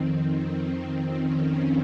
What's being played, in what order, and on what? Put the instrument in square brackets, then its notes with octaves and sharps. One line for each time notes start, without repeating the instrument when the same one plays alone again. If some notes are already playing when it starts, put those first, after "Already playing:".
Already playing: [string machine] F2 D#3 C4
F2 D#3 C4
C#4